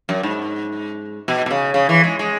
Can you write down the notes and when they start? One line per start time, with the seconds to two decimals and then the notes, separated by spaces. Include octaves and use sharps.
0.09 F#2
0.23 G#2
1.28 B2
1.46 B2
1.51 C#3
1.74 C#3
1.89 E3
2.04 G#3
2.19 G#3